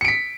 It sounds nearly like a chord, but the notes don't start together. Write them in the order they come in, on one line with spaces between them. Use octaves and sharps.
C#7 D7 B6